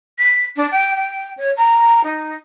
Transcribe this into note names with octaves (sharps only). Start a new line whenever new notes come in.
B6
D4
G5
G5
C#5
A#5
D#4